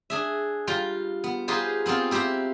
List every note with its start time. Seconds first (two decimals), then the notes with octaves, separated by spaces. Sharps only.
0.10 D4 G#4 E5
0.67 G3 F4 G5 A#5
1.24 B3
1.48 D#4 F4 G4 G#4 B4 C5
1.86 B3 C4 D#4 F4
2.11 E4 G4 C5 F5 A#5